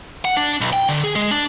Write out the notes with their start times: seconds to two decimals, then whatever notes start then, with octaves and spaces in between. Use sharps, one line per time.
0.25 F#5
0.37 D4
0.61 B1
0.73 G5
0.89 D3
1.04 G#4
1.16 G#3
1.31 D4